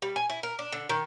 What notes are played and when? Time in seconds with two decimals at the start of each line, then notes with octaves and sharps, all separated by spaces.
0.02 G3
0.16 G#5
0.30 E4
0.43 A#4
0.59 D4
0.72 D3
0.89 D#3